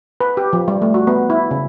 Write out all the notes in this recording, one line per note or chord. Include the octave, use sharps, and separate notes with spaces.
B4
G4
F3
G3
A3
F#4
B3
E4
C#3